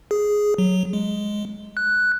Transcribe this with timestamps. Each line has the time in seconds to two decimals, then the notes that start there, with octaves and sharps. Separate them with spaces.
0.11 G#4
0.58 F#3
0.93 G#3
1.77 F#6